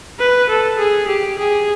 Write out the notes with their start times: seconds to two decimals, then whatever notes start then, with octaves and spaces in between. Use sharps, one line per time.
0.20 B4
0.49 A4
0.79 G#4
1.08 G4
1.39 G#4